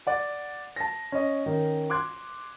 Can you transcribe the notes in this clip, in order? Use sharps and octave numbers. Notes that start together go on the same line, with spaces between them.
D5 F#5
A5 A#6
C#4 D#5
D#3 C#4
C6 D6 F#6 G#6